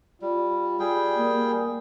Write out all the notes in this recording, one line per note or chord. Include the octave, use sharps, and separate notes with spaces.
G3 F4
G3 G#4 G5
A#3